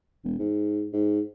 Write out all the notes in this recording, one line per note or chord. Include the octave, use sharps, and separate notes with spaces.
E1
G#2
G#2